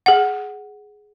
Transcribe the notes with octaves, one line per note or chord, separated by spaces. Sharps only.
G#4 F#5